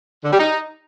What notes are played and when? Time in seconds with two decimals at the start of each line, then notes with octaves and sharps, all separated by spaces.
0.23 D3
0.31 G3
0.39 D#4